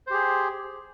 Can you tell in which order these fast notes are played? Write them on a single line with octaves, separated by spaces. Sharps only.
C5 G4 G#4